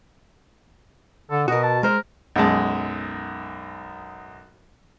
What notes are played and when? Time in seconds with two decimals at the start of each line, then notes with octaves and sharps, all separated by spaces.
1.31 D3 A4
1.48 B2 F#4 A#4 D#5
1.63 A5
1.83 G#3 A#4 C5
2.36 B1 F#2 G#3 A5